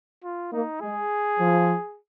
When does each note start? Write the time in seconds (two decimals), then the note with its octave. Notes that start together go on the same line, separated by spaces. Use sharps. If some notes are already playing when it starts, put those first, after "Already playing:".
0.24 F4
0.52 A#3 D#4
0.81 G#3 G#4
1.39 F3